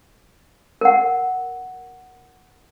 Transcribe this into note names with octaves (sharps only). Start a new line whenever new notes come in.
A#4 F#5